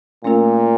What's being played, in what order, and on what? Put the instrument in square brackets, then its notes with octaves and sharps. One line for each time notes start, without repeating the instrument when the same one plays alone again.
[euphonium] A#2 [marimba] A3 C#4 F4 A#4